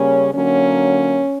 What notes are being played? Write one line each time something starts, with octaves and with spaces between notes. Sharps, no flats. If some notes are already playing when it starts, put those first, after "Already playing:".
Already playing: C#3 G3 A#3 C#4
D3 F#3 A#3 C#4